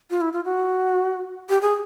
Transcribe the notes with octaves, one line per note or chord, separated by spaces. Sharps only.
F4
E4
F4
F#4
G4
G#4